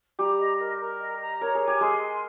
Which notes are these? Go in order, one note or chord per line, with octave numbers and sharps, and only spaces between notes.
G3 G4 A#5
D#5
A#4
A#4
D#5
A#5
A#4 C#5
G#4
G#5
G4
G#3 G#4 C6
G#5